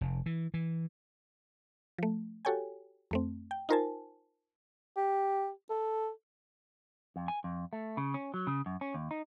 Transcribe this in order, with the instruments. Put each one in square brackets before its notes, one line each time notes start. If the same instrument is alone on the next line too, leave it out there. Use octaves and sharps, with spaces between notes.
[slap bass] F1
E3
E3
[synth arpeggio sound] F3 A3
F#4 G4 A4 C#5 G5 G#5
F2 A3 C4
G5
D#4 F4 A#4 C5 G#5 A5
[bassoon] G4
A4
[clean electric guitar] F2
G#5
F2
A3
C#3
C#4
F#3
C#3
F#2
C#4
D#2
D#4